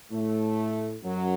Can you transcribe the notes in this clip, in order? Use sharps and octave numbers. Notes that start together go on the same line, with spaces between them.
A2 A3
F#2 F#3